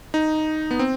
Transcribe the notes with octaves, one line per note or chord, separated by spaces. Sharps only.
D#4
B3
C4